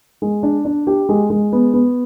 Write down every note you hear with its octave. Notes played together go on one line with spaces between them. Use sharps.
G#3
D4
D4
G4
G#3
G#3
B3
B3